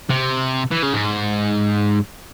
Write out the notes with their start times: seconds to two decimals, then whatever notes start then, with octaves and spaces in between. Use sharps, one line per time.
0.10 C3
0.71 E3
0.83 C#3
0.93 G#2